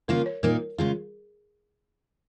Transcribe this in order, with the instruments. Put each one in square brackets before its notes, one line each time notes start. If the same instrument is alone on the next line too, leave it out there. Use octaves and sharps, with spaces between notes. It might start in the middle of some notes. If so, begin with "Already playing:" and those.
[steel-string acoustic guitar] C#3 A#3 F4 [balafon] A#4
[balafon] C#5
[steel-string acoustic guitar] A#2 A#3 D#4 [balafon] A#4
[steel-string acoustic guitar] C#3 G#3 F4 [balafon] G#4